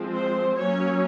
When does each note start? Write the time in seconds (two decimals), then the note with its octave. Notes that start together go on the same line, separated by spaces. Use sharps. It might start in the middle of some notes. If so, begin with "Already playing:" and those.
Already playing: F3 G#3 C4
0.14 C5
0.56 F#3 A#3 C#4 C#5